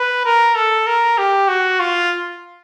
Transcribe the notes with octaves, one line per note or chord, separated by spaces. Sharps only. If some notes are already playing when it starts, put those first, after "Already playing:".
Already playing: B4
A#4
A4
A#4
G4
F#4
F4